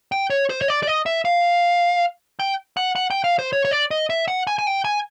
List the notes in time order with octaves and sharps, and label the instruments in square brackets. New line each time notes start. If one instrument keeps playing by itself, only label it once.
[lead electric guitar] G5
C#5
C5
C#5
D5
D5
D#5
E5
F5
G5
F#5
F#5
G5
F5
C5
C#5
C#5
D5
D#5
E5
F#5
G#5
G#5
G5
G#5